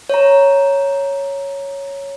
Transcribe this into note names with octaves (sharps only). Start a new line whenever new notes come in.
C#5 A#5